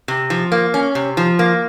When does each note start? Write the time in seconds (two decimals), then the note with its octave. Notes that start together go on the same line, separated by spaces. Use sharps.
0.08 C3
0.30 F3
0.52 A#3
0.74 C#4
0.95 C3
1.17 F3
1.39 A#3